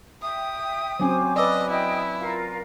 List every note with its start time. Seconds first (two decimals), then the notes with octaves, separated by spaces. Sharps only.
0.22 E5 G5 D#6
0.99 F#3 C4 C#4 C5 G#5 D6
1.36 B4 D5 D#5 A5 D6 E6
1.70 E4 D#5 G5 D#6
2.20 F4 A#4 F5